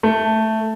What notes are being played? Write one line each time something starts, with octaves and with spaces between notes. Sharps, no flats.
A3